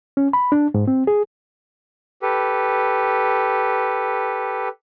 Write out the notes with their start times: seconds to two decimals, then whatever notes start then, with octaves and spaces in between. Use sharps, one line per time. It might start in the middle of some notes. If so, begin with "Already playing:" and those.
0.17 C#4
0.33 B5
0.52 D4
0.74 G#2
0.88 C4
1.07 G#4
2.22 G4 A4 B4